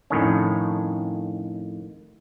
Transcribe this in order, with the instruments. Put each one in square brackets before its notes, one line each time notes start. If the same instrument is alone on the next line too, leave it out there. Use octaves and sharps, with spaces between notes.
[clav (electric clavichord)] F2 A2 D#3 C#4